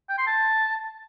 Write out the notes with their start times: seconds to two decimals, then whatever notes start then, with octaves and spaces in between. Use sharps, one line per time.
0.09 G5
0.18 C6
0.27 A5